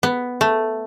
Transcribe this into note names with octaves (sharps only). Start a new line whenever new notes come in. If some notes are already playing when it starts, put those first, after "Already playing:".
B3
A3